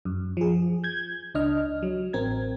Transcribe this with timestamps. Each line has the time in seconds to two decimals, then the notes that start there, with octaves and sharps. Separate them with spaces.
0.05 F#2
0.37 F3 G#4
0.84 G6 G#6
1.35 C#2 D4 D#5 F6
1.83 F#3
2.13 A1 C4 A#4 G#6